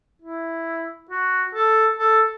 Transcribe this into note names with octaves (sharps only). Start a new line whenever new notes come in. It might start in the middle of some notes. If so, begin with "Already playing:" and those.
E4
F#4
A4
A4